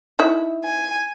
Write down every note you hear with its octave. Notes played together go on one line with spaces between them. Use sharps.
D#4 E4 E5
G#5